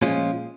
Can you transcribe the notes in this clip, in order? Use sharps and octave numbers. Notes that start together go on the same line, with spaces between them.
A#2 F3 G#3 C#4 F4